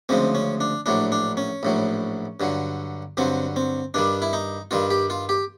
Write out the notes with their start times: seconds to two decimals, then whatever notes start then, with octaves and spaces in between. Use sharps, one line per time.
0.09 D2 C#3 F3 G#3 C4
0.35 C#4
0.61 D4
0.86 A#1 A2 F#3 D4
1.12 D4
1.37 C#4
1.63 A#1 A2 F#3
2.40 G2 D3 F#3
3.17 G2 D3 F#3 C4
3.56 C4
3.94 G2 D#3 G3 D4
4.22 E4
4.33 D#4
4.71 G2 D#3 G3 F4
4.91 G4
5.10 F4
5.29 G4